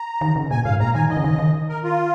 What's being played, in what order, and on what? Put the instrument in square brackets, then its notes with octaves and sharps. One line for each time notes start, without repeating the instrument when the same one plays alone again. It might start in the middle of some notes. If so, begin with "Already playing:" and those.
Already playing: [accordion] A#5
[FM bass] D#3
C#3
[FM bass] A#2 [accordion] G#5
[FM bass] G#2 [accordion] F5
[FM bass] A#2 [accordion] A#5
[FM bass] D#3 [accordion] G#5
[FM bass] D#3 [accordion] D#5
[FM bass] C#3
D#3
D#3
[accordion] A#4
F4